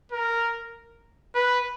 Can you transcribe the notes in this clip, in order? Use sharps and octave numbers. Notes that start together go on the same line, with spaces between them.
A#4
B4